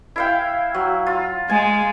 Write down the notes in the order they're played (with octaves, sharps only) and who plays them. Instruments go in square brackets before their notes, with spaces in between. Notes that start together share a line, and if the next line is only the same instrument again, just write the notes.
[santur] E4 F5 G5
F#3
F4
[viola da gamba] G#3 [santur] G#5